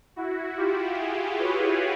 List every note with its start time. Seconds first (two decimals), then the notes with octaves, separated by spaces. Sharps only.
0.16 E4 F#4
0.57 F4 G4
0.98 F#4 G#4
1.39 B4 C#5